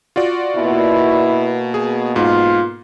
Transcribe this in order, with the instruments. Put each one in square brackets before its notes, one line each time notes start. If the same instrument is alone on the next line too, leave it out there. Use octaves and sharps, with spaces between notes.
[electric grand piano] F4 F#4 D5
[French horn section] B2 A#3 B3 [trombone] E4
[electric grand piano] G#4
[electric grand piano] G#2 [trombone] F4